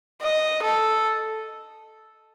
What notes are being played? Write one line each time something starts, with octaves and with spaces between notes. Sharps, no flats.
D#5
A4